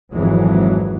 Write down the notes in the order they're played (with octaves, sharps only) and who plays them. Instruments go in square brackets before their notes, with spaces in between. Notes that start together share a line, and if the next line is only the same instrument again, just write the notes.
[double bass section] G#1 F2 E3 F#3 G#3